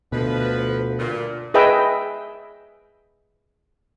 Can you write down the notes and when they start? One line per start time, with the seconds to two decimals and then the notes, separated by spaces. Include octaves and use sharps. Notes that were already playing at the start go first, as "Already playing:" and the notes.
0.12 D2 B2 F3 B4
0.98 G2 A#2
1.54 G#4 B4 D#5 E5 G5